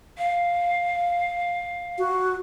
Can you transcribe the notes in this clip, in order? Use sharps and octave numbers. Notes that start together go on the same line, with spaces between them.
F5
F#4